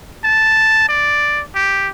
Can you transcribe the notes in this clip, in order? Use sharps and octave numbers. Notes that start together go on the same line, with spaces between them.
A5
D5
G4